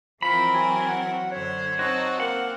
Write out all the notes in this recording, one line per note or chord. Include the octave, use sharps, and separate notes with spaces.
E3 F3 C4 A#4 B5
F#3 G#5
F#5
F#2 D3 C5 C#5
C4 D#4 F#4 A5
A#3 C4 F#5